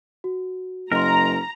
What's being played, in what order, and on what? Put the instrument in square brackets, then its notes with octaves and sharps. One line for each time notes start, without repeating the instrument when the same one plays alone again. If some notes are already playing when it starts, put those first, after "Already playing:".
[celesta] F#4
[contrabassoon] F#1 [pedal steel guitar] A#4 [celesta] D#5 C6 [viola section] A#5